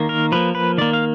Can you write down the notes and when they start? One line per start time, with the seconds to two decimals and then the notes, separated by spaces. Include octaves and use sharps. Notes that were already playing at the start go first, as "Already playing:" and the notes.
Already playing: D#3 A#3
0.09 A#4
0.32 F3 A#3 B4
0.55 B4
0.78 D#3 A#3 D5
0.93 F5